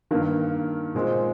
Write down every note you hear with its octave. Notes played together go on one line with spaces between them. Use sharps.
G2 D#3 A#3
A#2 G#3 C4